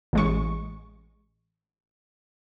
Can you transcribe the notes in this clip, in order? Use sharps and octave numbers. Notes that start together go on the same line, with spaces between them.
A1 G#3 C#6